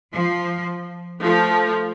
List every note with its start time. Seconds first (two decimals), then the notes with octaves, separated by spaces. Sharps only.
0.13 F3
1.21 F3 A3